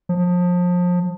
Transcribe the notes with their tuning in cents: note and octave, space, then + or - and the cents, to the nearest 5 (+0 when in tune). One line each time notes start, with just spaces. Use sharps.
F3 +30